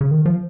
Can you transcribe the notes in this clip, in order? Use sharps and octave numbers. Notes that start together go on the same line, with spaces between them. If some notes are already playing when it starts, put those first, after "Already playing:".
C#3
D#3
F3